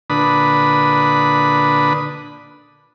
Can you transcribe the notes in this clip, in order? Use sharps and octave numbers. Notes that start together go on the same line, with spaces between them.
A#2 D3 D4 B4 B5 D#6